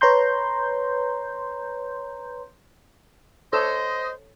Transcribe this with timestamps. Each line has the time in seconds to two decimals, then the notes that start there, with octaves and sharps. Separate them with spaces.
0.01 B4 C#5 A#5 C6 G6
3.53 A4 C5 C#5 D#5 E6